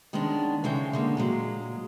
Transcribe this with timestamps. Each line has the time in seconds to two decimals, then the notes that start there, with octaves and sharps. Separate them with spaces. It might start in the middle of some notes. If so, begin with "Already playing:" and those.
0.13 D#3 G#3 B3 C#4 D4
0.64 C#3 E3 G#3 C#5 G5
0.93 D3 G#3 A#3
1.17 A#2 F#3 G#3